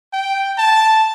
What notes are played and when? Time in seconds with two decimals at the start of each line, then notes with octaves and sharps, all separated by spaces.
0.13 G5
0.58 A5